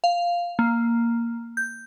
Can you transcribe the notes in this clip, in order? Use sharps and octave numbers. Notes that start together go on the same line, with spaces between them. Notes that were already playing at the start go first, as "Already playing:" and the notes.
F5
A#3
G6